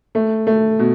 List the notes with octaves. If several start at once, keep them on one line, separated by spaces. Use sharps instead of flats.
A3
A3
B2